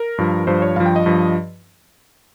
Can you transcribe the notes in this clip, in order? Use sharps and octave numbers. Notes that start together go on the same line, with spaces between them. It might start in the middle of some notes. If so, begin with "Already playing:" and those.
Already playing: A#4
G2 F3
G2 F3 C5
C#5
G2 F3 F5
G5
D#5
G2 F3